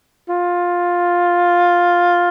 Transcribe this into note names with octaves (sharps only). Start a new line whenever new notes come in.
F4